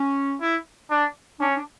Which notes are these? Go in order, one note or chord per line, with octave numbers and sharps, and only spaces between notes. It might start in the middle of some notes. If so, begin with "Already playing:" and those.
Already playing: C#4
E4
D4
C#4 D4
D4